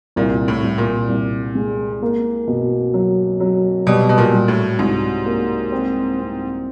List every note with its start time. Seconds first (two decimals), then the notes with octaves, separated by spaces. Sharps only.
0.16 C2 A#2
0.48 A2
0.63 C2
0.78 A#2
1.09 C2
1.55 G#3
2.02 A#3
2.47 B2
2.94 F#3
3.40 F#3
3.86 B2 G3
4.09 B2
4.18 A#2
4.33 G3
4.48 A2
4.79 C2 G#2
5.26 A#3
5.72 C4
6.19 C4